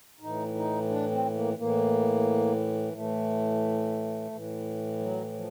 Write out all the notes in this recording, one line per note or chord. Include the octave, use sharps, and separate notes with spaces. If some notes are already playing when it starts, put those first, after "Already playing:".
A2 E3 D#4
D#4
D4
C4
A#3
A2 E3 A#3
A2 E3 A3
A2 E3
F#3
F3